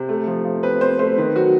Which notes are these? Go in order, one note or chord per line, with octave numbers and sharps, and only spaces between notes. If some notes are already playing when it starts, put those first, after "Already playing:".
Already playing: C3 C5
A3
F3
F3
C4 B4
C4 C5
A3 C5
D#3 B4
F#3 F#4